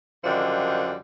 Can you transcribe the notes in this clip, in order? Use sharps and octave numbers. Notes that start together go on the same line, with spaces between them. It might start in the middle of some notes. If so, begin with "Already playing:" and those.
F#2 D3 D#3 F3 G3